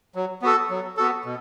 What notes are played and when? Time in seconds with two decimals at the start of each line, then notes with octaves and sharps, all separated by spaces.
0.15 F#3
0.42 B3 F#4 A4
0.70 F#3
0.97 B3 F#4 A4
1.25 B2